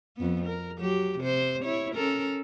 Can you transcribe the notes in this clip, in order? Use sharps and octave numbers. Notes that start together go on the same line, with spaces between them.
F2 B3
A#4
F#3 G4
C3 C5
E4 C#5
C#4 A4 A#4